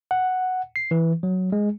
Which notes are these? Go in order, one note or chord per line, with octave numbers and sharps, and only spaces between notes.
F#5
C7
E3
F#3
G#3